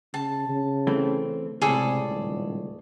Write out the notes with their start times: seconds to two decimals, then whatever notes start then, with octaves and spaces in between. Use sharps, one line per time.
0.14 C#3 A5
0.49 C#3
0.87 E3 A3 C4
1.62 C#2 A2 C3 G#4 A4 D5
2.09 D#1